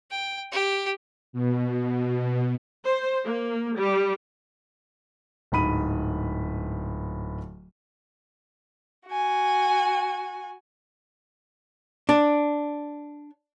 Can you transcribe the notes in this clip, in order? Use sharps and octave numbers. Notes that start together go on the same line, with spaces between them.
G5
G4
B2
C5
A#3
G3
D1 G#2 B5 D#7
F#4 G#5
D4